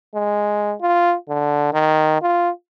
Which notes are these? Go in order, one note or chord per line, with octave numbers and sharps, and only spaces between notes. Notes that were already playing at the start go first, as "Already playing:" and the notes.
G#3
F4
D3
D#3
F4